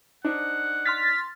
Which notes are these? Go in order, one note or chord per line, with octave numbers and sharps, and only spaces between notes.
D4 D#4 C5 F#5
C6 F6 A6 B6